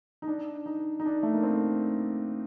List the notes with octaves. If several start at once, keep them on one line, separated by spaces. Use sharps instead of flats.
D#4
D4
D#4
D#4
D4
A3
A#3
C4